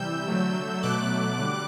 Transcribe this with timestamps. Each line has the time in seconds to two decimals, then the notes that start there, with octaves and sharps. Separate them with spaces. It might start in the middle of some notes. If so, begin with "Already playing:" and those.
Already playing: C3 E3 G3 E6 G6
0.28 D3 F#3 A3
0.83 B2 F#3 A3 D6 F#6
1.39 D3 G3